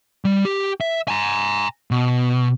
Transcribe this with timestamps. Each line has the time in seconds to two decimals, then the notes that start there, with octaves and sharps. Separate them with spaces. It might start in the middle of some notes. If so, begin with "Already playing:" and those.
0.25 G3
0.45 G4
0.81 E5
1.08 G#5 A#5
1.91 B2